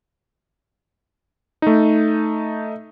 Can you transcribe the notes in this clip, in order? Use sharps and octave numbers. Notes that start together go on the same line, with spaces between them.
A3 D#4